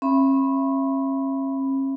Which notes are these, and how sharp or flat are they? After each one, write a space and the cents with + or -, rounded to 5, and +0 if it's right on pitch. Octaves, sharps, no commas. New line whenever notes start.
C#4 -40 E5 +25 B5 +0